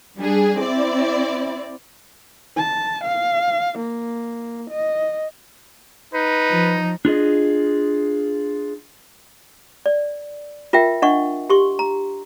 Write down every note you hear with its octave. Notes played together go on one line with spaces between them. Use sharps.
G3 D4 G#4
C4 E4 D5
A5
F5
A#3
D#5
D#4 B4
F3
D4 F4 G#4 D#5
D5
F4 A#4 E5 G5
D4 D#5 F#5 C#6
G4 C6 C#6
A#5